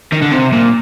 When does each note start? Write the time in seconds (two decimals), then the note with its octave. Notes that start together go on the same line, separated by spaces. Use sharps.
0.12 D#3
0.22 D3
0.31 C3
0.53 A#2